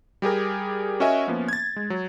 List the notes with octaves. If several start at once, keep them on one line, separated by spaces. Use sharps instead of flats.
G3 G4 G#4 A#4
C#4 F#4 A#4 D#5 E5 G#5
F3 A#3 B3 C#4
G#6 A6
G#3
F#3